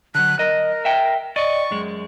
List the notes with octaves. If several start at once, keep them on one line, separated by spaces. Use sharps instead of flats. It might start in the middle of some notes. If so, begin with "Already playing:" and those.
D3 F#3 F#6
A#4 D#5
E5 G5
D5 D#5 C#6
F#2 G#3